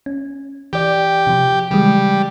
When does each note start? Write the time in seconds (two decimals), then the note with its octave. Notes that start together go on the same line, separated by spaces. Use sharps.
0.06 C#4
0.73 E3 G4 D5 G5
1.27 C3 F3
1.71 C#3 E3 G3 G#3